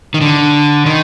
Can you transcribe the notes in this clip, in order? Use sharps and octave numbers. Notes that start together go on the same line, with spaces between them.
D#3
D3
D#3